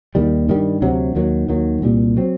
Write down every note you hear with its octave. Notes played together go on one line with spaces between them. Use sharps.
D#2 D#3 G3
G2 D#3 G3
D2 C3 F#3
D#2 D#3 F#3
D#2 D#3 F#3
C2 A#2 G3
F#3 C4